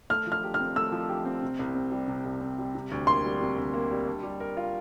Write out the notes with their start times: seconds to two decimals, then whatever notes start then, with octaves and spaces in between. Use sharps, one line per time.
0.10 A3 F6
0.27 F3
0.32 F6
0.43 G4
0.54 F6
0.60 C4
0.76 A3 E6
0.92 F3
1.09 G4
1.25 C4
1.42 C3
1.59 C2
1.75 C4
1.92 G3
2.08 C3
2.25 C2
2.41 C4
2.59 G3
2.75 C3
2.91 D2
3.07 A#3 C6
3.24 G3
3.41 C3
3.58 D2
3.74 A#3
3.91 G3
4.07 D4
4.23 G3
4.40 A#4
4.57 F4